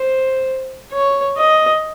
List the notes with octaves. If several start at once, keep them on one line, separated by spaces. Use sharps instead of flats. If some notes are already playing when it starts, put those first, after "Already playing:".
Already playing: C5
C#5
D#5